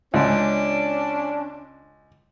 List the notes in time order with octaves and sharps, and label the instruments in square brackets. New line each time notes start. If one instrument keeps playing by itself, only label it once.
[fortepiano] C#2 [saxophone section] C#4 D4